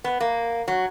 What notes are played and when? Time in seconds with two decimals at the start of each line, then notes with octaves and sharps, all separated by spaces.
0.04 B3
0.20 A#3
0.68 F#3